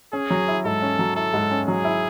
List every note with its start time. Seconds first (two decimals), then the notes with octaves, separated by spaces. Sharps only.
0.13 C#4 G#4
0.31 F#3
0.48 E4
0.65 G#2 A4
0.82 C#4
0.99 F#3
1.16 E4 A4
1.34 G#2
1.51 C#4
1.68 F#3 G#4
1.85 E4